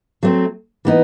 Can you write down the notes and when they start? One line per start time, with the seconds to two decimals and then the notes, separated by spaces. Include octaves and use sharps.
0.23 F#3 A3 C4
0.85 E3 B3 D#4